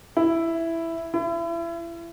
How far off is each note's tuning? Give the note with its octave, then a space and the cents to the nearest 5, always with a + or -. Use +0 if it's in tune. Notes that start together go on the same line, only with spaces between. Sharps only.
E4 +5
E4 +35